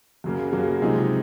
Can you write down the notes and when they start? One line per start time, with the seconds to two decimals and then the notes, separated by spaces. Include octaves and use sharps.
0.24 F#2 C#3 F#3 A#3
0.53 F#2 C#3 F#3 A#3
0.81 C3 F3 G#3 D#4